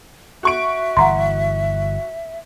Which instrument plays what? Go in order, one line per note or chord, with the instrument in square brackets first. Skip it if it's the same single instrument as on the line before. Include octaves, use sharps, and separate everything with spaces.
[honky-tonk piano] F#4 C#6 D7 [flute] E5
[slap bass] G1 E3 [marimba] F#5 A#5 C6